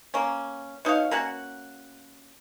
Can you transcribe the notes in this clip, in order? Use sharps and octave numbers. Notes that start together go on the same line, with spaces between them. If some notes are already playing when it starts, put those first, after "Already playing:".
A#3 C#4
B2 D#4 C#5 F5
A#3 C#4 F#4 F#5